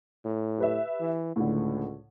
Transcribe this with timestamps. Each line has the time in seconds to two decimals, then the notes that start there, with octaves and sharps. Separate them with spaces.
0.24 A2
0.58 G4 B4 E5
1.00 E3
1.36 C#2 A2 D3